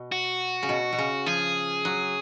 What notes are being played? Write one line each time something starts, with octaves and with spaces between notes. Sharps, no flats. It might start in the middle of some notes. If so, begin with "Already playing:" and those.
Already playing: B2
F#4
C#3
B2
B2
C#3
F3 G#4
F#3